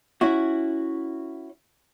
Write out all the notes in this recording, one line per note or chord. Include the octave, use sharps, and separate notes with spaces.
C#4 E4 F#4